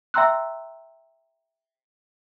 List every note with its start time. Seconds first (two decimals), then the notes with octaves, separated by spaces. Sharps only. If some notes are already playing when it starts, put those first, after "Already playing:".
0.14 E5 G5 A#5 C6 E6 F#6